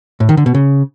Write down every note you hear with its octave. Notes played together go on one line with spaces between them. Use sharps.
A2
D#3
D3
B2
C#3